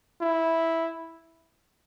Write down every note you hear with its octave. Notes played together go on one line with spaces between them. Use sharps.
E4